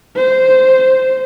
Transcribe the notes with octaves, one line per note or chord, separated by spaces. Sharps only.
C5